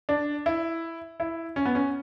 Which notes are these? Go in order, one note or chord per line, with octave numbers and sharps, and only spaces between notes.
D4
E4
E4
C#4
B3
C#4